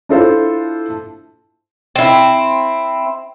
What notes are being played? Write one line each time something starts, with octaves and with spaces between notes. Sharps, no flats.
D4 E4 F4 A4 C5
C4 E4